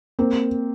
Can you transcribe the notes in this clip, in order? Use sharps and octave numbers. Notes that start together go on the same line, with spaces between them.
A#3 C4